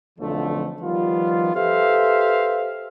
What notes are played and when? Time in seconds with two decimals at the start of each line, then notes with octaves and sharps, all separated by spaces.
0.19 B1 F2 D3 E3 F3 A3
0.81 D#3 F3 G3 B3 F4
1.55 G4 A4 B4 C5 E5 F5